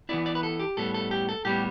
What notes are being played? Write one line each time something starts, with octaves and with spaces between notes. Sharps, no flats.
E3 B3 E4 D5
D5
B4
A4
G4
A2 G3 B3 A4
A4
G4
A4
A2 G3 B3 G4